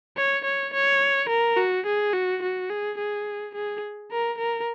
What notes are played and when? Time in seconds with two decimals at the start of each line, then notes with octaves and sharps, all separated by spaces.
0.17 C#5
0.45 C#5
0.74 C#5
1.29 A#4
1.57 F#4
1.86 G#4
2.13 F#4
2.42 F#4
2.70 G#4
2.98 G#4
3.55 G#4
4.11 A#4
4.38 A#4